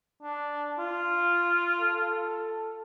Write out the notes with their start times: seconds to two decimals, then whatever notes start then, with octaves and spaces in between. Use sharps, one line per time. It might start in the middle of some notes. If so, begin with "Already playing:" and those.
0.22 D4
0.79 F4
1.80 A4